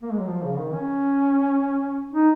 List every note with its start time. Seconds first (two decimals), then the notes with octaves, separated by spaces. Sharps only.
0.02 A#3
0.12 G#3
0.19 F#3
0.27 F3
0.43 C#3
0.53 C#3
0.58 D#3
0.73 C#4
2.13 D#4